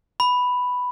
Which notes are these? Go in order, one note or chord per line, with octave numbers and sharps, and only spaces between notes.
B5